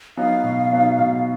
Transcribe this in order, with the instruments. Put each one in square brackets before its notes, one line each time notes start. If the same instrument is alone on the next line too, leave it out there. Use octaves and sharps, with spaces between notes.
[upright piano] F#3 B3 D#4 [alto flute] F5
[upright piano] B2
F#3 B3 D#4
B2